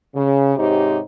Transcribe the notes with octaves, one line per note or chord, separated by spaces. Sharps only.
C#3
G#2 C3 D#4 G4 C#5